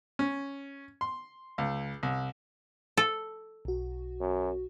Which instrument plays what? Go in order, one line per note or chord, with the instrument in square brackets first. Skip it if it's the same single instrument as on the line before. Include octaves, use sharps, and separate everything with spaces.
[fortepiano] C#4
C6
C#2
C2
[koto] A4
[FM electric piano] B1 F#4
[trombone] F#2